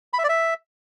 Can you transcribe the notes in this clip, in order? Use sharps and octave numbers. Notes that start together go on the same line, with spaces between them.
B5
E5
D5
E5